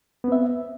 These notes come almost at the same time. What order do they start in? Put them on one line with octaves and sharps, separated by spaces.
B3 C4 E5